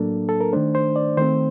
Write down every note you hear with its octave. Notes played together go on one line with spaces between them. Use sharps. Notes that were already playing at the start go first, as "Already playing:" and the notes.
Already playing: A2 F#3 A#3 D4 A4
A4
A#4
D#3 A3 D4 C5
C5
D5
D#3 A3 C4 C5